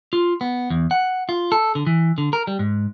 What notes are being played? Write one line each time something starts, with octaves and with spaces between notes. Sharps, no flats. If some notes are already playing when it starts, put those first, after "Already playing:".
F4
B3
E2
F#5
F4
A4
D3
E3
D3
A#4
G3
G#2